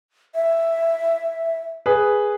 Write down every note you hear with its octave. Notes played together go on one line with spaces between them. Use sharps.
E5
G#4 B4